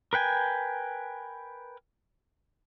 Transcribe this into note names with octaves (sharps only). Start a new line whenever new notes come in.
A#4 B4 G5 G#5